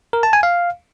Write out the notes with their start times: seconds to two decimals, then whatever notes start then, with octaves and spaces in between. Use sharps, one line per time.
0.13 A#4
0.23 A5
0.33 G#5
0.43 F5